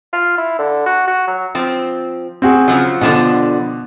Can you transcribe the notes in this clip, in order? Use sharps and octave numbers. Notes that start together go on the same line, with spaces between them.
F4
E4
D3
F#4
F#4
F#3
F3 C4
C4 F#4 G#4
C#3 F3 F#3
B2 D3 F3 G3